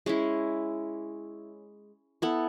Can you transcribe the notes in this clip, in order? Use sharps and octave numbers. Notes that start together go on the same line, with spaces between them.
G#3 C#4 E4
B3 E4 A4